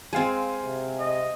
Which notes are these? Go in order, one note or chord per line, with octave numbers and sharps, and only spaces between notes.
G#3 C4 F5 G#5
C3
D#5